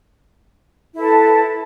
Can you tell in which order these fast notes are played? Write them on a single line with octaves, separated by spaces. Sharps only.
E4 A4 B4 A5